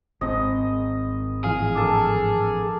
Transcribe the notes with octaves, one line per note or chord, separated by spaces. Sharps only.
G#1 C4 D#5
A2 E3 F3 G#4 F5
D4 A4 A#4